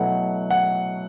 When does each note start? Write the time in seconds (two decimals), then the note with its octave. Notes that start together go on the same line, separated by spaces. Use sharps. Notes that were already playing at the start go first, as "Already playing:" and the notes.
Already playing: B2 F#3 A3 E4 F#5
0.51 F#5